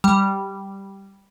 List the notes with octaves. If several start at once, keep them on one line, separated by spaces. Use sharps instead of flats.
G3